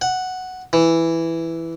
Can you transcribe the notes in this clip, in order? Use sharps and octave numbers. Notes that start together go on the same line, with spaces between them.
F#5
E3